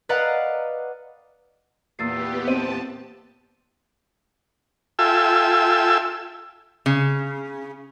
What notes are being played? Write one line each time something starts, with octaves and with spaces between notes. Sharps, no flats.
B4 D5 D#5 F5 F#5 A#5
E2 A#2 A#3 B3 G4 E6 A6 C7
C4 A5 D#7
F4 A4 E5 G5 G#5 E6
C#3